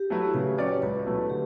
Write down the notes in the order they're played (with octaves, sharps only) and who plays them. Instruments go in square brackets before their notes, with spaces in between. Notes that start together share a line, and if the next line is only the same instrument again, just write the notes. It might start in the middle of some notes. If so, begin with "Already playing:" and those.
Already playing: [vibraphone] G4
[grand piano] F#3 A3 E4 B4
[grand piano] C#3 [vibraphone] B4
[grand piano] F#3 C#4 G4 D5 [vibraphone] C#5
[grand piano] C#2 [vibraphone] B4
[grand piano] B2 F#3 A3 E4
[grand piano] D3 [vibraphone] G4